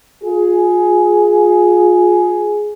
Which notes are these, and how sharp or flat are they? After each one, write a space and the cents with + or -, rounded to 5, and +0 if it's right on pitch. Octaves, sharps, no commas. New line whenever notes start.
F4 +30 G#4 +10